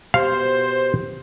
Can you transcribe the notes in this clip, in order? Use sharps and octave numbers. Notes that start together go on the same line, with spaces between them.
B2 G4 C5 F5 C6